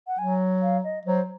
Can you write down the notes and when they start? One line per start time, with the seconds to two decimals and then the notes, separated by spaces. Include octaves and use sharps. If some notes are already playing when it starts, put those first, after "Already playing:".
0.07 F#5
0.19 F#3 G#5
0.62 F5
0.84 D#5
1.06 F#3 C5